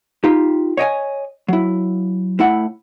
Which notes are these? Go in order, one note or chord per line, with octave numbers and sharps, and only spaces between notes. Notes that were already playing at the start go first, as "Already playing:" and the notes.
D#4 F4 G4
C#5 D#5 G5 G#5
F#3 E4
A2 E4 F#5